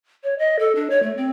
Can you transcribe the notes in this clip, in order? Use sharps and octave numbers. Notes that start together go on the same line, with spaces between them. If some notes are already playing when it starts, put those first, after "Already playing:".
C#5
D#5
A4
D4
C#5
A3
C4